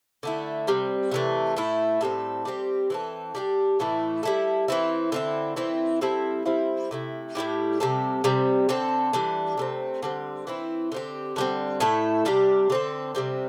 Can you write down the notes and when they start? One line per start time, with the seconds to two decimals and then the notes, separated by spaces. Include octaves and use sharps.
0.23 D3 A3 E4
0.67 C3 G3 C4
1.12 C3 E3 A3
1.56 A2 A3 E4
2.01 A2 G3 C4 A4
2.45 G3 C4 G4
2.90 E3 C4 A4
3.35 G3 D4 G4
3.80 A2 E3 A3 E4
4.23 G3 E4 A4
4.68 E3 C4 E4
5.12 D3 C4 E4
5.56 E3 C4 E4
6.01 G3 C4 E4 A4
6.46 G3 C4 E4
6.91 C3 A3 E4
7.35 A2 G3 E4 G4
7.80 C3 G3 C4 A4
8.24 C3 G3 C4
8.69 D3 C4 A4
9.13 E3 G3 D4
9.58 C3 A3 C4
10.03 D3 G3 C4
10.47 E3 C4 E4
10.92 D3 C4 G4
11.36 D3 G3 C4
11.80 A2 A3 E4 A4
12.25 C3 G3 D4 G4
12.70 D3 C4 A4
13.15 C3 G3 C4